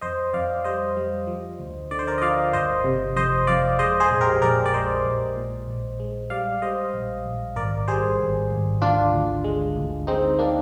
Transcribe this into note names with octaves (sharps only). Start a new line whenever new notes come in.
F2 C5 D#5
F2 D5 F5
G3 C5 D#5
G3
F3
D2
D3 D5
C5
A#4 D5
D#5
F3 D5 F5
G1 C5 D#5
C3
F2 C5 D#5
F2 D5 F5
G#3 C5 D#5
G#4 C5
A#1
G4 A#4
A#1 A#4 D5
D5
G#3 C5 D#5
A#1
A#2
A#1
G#3
G3 D5 F5
G3 C5 D#5
A#1
A#1
G#1 A#4 D5
G3 G#4 C5
G#1
G#1
D2 D4 F4
D2
G#3
D2
G#3 C4 D#4
A#3 D4